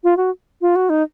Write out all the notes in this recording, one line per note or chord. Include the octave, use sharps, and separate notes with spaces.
F4
F#4
F4
F#4
D#4